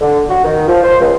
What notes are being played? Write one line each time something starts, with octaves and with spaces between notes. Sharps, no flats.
D3
F#4
D#3
F3
C5
C#2